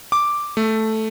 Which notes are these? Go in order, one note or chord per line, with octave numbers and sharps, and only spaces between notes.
D6
A3